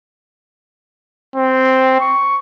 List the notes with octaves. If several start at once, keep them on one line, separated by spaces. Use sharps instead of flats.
C4
C#6